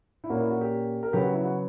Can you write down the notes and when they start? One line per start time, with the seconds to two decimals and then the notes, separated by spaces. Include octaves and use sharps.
0.24 E4
0.29 A#2 A#3 C#4 F#4
0.40 E4
0.50 F#4
0.61 G4
1.03 A#4
1.13 C#3 F#3 B3 G4
1.23 F#4
1.33 E4
1.43 F#4